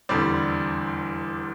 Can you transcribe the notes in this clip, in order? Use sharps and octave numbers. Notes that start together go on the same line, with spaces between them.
F1 E2 D3 G3 C4 D5